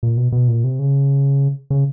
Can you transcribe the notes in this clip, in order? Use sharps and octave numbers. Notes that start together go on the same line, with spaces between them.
A#2
B2
B2
A#2
C3
C#3
C#3